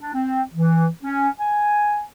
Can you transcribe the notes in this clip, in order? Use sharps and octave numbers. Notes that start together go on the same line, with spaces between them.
D4
C4
E3
C#4
G#5